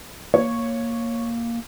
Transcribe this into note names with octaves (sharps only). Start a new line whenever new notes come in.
A#3 C#5